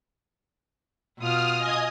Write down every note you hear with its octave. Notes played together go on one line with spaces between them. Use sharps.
B2 F4 D#6 F6
D#5 G#5 D#6